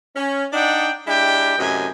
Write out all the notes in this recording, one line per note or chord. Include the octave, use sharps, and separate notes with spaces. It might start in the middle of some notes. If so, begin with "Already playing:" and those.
C#4
D4 D#4 D5 F#5 G5
G#3 D4 E4 G4 G5
F#2 A2 C3 D#5 G#5